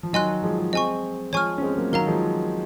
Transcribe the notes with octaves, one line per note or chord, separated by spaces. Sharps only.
F3
D#3 F#3 D#5 G#5 C6 F#6
F3 G#3
F3 G#3
G#3 C4 D#5 G#5 C#6
F3 G#3 C#5 G#5 C#6 F6
C#4
G#3 C4
G#3
F#3 A#3
D#3 F#3 A#4 F5 A#5
F3 G#3